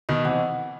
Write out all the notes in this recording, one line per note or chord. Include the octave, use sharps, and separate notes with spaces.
B2 D#3 D#5
C3 E3 F#5